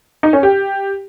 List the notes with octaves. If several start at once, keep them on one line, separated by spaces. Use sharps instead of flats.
D#4
C#4
G4